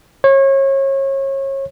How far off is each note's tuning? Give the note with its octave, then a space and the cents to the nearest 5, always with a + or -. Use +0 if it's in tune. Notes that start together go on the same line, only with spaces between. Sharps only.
C#5 -30